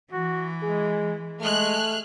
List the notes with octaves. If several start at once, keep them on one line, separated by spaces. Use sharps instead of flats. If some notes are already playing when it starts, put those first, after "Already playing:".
E3 F#4
G#3 G#4
G#3 A3 G#4 F6 F#6